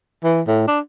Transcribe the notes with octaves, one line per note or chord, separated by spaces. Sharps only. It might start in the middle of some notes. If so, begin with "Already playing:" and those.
E3
A2
D4